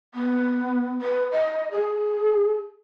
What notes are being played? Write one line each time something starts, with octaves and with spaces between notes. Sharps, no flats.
B3
B4
D#5
G#4